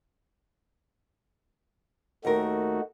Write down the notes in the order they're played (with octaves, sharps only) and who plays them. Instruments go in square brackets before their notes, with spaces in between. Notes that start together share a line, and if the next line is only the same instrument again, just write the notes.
[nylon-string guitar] D#2 A#4 [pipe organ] A3 D#4 F#4